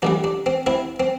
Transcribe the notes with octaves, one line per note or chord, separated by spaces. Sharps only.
A1 A2 G3 D4
D4
C4
C4 E4
C4